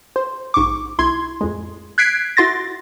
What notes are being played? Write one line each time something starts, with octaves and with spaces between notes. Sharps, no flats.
C5
A#1 G#2 C#6 D6
B1 E4 C6 G#6
F2 A2 G#3
F#6 G#6 B6 C7 D7
E4 F#4 C6 A6 A#6